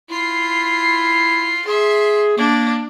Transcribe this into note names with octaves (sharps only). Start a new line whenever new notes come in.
E4 F4 C7
G#4 E5 C6
A#3 D4